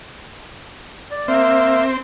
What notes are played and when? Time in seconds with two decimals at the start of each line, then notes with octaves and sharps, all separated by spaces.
1.11 D5
1.28 A#3 C4 E5 F6